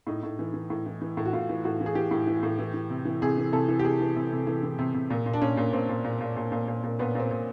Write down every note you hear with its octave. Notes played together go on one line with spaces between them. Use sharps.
A2 D#4
A2
E3
E3
A2
E3
E3
A2
F#4
A2 F4
E3
A2 F#4
E3
G#4
E3 G4
A2
E3
A2
E3
E3
C3
E3
C3 G#4
E3
C3 A4
E3
G4
C3 G#4
E3
C3
C3
E3
E3
C3
C3
A#2
A#2
D4
A#2 C#4
A#2
A#2 C4
A#2
A#2
A#2
A#2
A#2
A#2
A#2
A#2 B3
A#2 C4
A#2